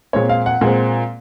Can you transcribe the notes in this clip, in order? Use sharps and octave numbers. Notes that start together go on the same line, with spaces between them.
A#2 G#3 C4 C#5
F5
F#5
A#2 G#3 C4